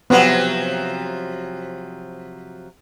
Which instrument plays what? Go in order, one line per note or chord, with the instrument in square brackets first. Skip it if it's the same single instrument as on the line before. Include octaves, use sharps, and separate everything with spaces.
[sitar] C3 F3 F#3 [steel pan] B3